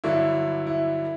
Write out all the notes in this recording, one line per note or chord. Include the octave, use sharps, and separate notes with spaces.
G2 D3 F#3 E4
E4